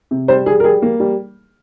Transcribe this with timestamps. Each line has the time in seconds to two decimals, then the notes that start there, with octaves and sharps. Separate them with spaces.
0.11 C3
0.28 G3 C5
0.46 G3 G#4
0.60 A#4
0.64 G3 G#4
0.82 A#3
1.00 G3